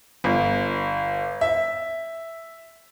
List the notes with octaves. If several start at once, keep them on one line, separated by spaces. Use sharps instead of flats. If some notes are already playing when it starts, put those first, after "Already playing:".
G1
E5